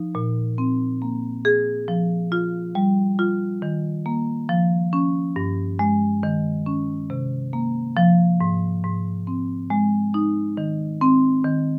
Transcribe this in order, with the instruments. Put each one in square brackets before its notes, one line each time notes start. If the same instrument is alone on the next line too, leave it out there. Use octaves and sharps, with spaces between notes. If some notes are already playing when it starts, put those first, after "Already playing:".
Already playing: [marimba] F3 D#4
A#2
C4
A#3
G#4
F3
F4
G3
F4
D#3
A#3
F3
C#4
G2
G#3
D#3
C#4
C3
A#3
F3
G#2
G#2
C4
G#3
D#4
D#3
C4
D#3